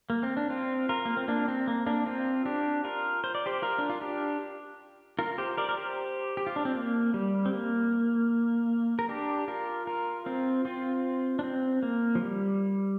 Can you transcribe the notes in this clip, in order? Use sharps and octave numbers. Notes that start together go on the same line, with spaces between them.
A#3
C4
D4
C4 F4
F4 A#4
A#3
C4
A#3 D4
C4
A#3
A#3 D4
C4 F4
D4 G4
F4 A#4
C5
D5
G4 C5
F4 A#4
D4
F4
D4 G4
F4 A#4
G4 C5
A#4 D5
A#4
G4 C5
G4
F4
D4
C4
A#3
G3
C4
A#3
A#4
D4 G4
F4 A#4
F4 A#4
C4 F4
C4 F4
D4
C4
A#3
F3
G3